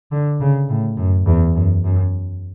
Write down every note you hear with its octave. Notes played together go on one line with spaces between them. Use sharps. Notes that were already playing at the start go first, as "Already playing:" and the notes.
D3
C#3
A2
F#2
E2
F#2
F#2